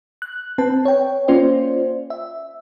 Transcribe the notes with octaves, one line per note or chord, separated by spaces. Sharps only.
F#6
C4 B4 A5
C#5 G5
A#3 C#4 F4 C5 D5
E5